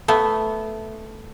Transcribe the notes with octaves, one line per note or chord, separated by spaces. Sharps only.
A3 B3